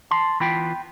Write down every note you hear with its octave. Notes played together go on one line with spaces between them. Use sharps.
A5 C6
E3 B3 F4 G5 B5